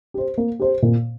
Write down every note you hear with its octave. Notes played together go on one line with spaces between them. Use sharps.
G4 C5
A#3
G4 C5
A#2